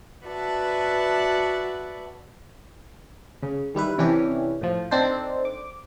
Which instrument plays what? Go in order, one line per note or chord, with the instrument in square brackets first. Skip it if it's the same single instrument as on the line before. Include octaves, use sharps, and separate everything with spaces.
[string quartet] F#4 B4 D5 E5 A5
[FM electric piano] C#3
D#3 G3 E4 B4
C3 E3 C#4 D4 E4 G4
A2 F3
C4 D4 D#4 A4 C5
D6